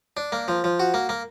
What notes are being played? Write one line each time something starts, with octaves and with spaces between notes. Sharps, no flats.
D4
A#3
F3
F3
F#4
A#3
A#3